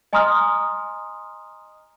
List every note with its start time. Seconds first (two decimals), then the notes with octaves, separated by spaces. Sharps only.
0.13 D#5 G#5 A#5 C6 D#6 F6